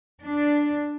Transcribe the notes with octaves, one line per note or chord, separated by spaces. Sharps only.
D4